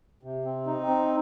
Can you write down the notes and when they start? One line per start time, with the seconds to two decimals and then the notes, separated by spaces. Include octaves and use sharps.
0.23 C3
0.45 C4
0.66 D#4
0.87 C4